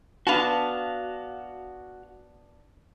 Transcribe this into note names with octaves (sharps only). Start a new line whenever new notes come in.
B3 D4 F#4 F5 A5